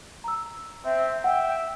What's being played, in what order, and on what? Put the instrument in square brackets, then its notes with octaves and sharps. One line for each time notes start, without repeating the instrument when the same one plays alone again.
[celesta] A#5 E6
[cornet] C4 [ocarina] E5
[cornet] E5 [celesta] F#5 [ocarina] G5